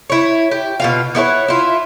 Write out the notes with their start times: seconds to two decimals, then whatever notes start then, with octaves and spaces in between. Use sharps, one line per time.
0.10 E4 C#5
0.51 G4
0.80 B2 F4 F5
1.15 B3 E4 A4 C#5
1.48 E4 F4